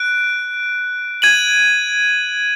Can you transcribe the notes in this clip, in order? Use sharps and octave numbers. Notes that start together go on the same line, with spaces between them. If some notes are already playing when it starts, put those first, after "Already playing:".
Already playing: F#6 D7
G#6 D#7 F#7